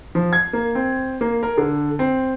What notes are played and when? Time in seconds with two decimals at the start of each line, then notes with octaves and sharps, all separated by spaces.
0.15 F3
0.33 G#6
0.53 A#3
0.75 C4
1.21 A#3
1.43 A#4
1.58 D3
1.99 C4